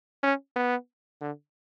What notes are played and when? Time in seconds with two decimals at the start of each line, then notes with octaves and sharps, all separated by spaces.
0.23 C#4
0.56 B3
1.21 D3